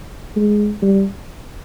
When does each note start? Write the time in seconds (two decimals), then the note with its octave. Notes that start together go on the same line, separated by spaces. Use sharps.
0.36 G#3
0.82 G3